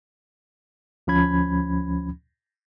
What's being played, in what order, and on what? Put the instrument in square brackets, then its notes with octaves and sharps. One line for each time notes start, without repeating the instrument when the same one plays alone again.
[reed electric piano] D2 F3 C#4 B5 G#6